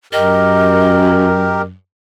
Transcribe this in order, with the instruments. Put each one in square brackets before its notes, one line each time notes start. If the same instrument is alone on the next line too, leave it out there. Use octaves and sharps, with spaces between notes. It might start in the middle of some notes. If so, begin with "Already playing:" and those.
[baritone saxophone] F#2 [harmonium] G4 A#4 [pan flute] D#5